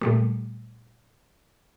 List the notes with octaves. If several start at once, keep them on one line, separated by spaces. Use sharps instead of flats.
A#2 G3 A3